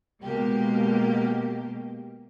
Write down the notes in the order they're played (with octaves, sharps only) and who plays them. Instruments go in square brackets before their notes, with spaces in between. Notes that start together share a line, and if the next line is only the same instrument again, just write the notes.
[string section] B2 G#3 A#3 G4